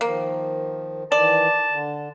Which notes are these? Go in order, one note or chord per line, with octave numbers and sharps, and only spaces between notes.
D#3 F3 A#3
D#3 E3 D5 A5
D3